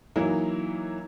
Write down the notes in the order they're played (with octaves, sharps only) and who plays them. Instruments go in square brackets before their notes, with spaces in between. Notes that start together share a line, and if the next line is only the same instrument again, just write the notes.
[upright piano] E3 F#3 A#3 D#4 E4